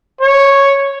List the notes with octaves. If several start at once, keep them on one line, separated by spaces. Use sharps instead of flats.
C#5